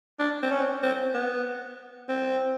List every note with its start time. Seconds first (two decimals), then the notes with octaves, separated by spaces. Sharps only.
0.19 D4
0.42 C4
0.51 C#4
0.83 C4
1.14 B3
2.08 C4